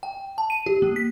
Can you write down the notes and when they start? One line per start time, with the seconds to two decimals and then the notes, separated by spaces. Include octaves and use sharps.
0.03 G5
0.38 A5
0.50 D#7
0.66 G4
0.82 A#3
0.96 B6